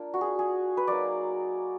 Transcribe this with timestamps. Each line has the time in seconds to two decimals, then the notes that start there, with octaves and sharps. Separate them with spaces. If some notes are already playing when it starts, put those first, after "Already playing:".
Already playing: A#3 D4 F4
0.14 F#4
0.21 G#4
0.39 G#4
0.77 B4
0.87 F#3 A#3 D#4 D5